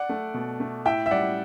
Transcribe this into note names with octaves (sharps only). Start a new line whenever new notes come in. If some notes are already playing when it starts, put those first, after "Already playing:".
Already playing: D5 F#5
A3
B2
A3
A2 E5 G5
E5
G3 D5 F#5